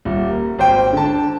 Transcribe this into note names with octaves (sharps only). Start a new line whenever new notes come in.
D#1
A#3
G#1 C5 G5
D3 A5